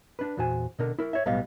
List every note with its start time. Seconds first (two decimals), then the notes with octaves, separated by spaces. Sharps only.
0.19 D4 B4
0.37 E2 A#2 F#4 C5 G#5
0.79 B2 D3 A#4
0.99 E4 A#4
1.13 C#5 E5
1.26 B1 A2 G3 B3 D#5 F5